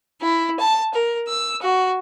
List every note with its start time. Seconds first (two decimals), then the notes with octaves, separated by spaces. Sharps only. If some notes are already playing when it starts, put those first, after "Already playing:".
0.21 E4
0.59 A5
0.94 A#4
1.29 E6
1.62 F#4